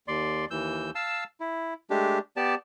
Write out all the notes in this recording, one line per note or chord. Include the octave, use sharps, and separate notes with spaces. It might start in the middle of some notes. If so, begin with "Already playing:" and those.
D#2 D5 C6
D#2 E3 E6 G6
F5 A5 E6
E4
G#3 A3 D4 G4
B3 G4 D5 A5